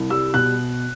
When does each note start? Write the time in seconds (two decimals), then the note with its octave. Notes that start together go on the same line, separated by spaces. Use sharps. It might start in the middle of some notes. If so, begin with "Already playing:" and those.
Already playing: C2
0.10 G3 E6
0.34 B2 F#6